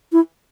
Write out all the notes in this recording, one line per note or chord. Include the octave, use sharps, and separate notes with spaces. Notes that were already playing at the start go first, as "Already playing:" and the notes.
E4